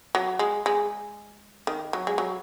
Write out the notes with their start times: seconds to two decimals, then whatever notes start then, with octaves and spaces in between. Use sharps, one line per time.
0.15 F#3
0.39 G#3
0.66 G#3
1.67 D#3
1.93 F#3
2.07 G#3
2.18 F#3